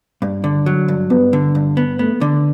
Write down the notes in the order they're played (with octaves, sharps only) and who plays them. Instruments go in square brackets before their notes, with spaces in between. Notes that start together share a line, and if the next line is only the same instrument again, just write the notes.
[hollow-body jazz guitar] G2
D3
F#3
G2
[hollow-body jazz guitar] G2 [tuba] B3
[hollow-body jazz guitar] D3
G2
B3
[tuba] A3 [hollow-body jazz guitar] B3
[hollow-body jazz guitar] D3